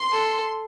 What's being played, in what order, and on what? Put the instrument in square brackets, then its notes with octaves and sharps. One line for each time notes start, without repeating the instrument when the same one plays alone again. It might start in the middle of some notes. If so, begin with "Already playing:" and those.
Already playing: [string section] C6
[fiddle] A4